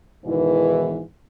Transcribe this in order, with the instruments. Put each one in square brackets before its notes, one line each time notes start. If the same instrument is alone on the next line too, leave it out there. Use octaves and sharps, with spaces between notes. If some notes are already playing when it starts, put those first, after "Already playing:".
[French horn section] E2 G#2 B2 D#3 E3